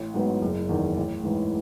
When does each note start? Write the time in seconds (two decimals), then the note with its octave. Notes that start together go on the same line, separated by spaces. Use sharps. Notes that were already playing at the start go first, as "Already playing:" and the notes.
Already playing: A1
0.14 G#2 F#3 B3
0.42 F#1
0.69 E2 D#3
0.97 A1
1.24 G#2 E3